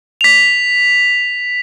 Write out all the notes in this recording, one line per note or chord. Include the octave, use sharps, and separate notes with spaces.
B6 F7